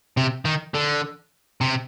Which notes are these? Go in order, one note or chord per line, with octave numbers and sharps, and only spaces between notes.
C3
D#3
D3
C3